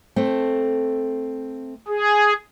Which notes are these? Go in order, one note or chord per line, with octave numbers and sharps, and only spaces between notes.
A3 C4
G#4